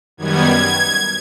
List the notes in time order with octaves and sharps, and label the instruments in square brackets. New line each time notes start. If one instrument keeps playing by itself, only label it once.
[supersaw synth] F#2 D#3 G3 B3 G#6